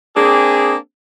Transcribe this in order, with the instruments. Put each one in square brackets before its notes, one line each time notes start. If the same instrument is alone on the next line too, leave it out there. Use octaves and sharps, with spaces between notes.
[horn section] A#3 C4 D4 G#4